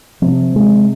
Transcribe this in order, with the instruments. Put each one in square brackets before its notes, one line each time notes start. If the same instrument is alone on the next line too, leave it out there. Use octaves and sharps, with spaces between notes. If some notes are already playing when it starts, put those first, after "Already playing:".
[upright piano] C3 [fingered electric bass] F3
[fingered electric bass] G#3